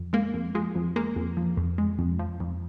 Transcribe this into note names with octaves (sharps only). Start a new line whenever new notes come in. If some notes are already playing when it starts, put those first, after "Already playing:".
Already playing: F2
G#3 A#3
F2
F3 G#3
F2
G#3 A#3
F2
F3
F2
G#3
F2
F3
F2